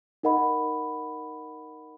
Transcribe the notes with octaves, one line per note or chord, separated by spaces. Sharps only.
D#4 A#4 D#5 F#5 B5